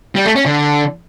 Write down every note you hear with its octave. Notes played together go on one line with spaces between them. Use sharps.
G3
A3
C#4
D3